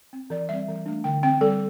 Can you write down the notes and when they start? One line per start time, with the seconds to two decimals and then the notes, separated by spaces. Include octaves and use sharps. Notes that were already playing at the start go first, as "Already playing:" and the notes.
0.13 C4
0.30 E3 D5
0.49 G3 C4 E5
0.68 E3
0.86 A3 D4
1.04 D3 G5
1.23 C4 G5
1.41 G3 A4